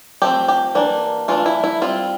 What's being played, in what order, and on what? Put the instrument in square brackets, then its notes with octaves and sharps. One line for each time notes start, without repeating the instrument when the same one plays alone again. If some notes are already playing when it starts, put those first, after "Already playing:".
[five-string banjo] F3 A3 C4 G4
G4
E3 A#3 D4
E3 A3 D4 F4
E4
E4
G3 C4 F4